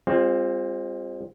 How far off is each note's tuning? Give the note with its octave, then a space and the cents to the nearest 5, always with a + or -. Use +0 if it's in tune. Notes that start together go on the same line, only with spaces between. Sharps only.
G#3 -45 C4 +10 F4 +0